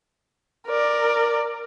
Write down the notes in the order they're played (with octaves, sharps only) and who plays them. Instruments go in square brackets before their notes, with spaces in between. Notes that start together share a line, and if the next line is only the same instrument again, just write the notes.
[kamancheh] A#4 D5